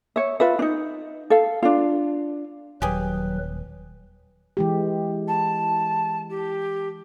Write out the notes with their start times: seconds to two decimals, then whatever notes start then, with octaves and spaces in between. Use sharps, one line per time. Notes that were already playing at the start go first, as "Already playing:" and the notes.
0.16 C#5 E5
0.40 F4 B4 E5
0.59 D4 D#4
1.30 A4 F5
1.63 D4 F4
2.82 D#1 F#3 G4 G#4 B4
4.57 E3 G#3 G4
5.27 A5
6.29 G4